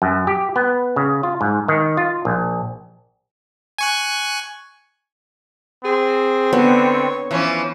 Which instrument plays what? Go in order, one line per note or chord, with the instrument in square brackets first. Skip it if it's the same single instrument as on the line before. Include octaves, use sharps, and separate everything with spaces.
[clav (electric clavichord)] F#2
G4
B3
C#3
F4
G#2
D#3
F4
A#1
[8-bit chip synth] G#5 C#6 F#6
[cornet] C4 [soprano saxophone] G#4
[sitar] D3 [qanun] B3 [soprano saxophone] C#5
[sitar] E3 F3 C#4